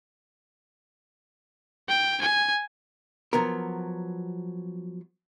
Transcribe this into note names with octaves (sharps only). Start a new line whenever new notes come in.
G5
G#5
F3 F#3 B3 A#4